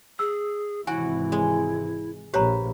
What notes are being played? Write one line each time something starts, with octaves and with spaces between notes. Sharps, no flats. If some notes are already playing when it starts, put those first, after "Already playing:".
G#4 E6
G#1 C3 E3 E4 F#4 G#5
G#3
A#1 G4 B4 C#5 A#5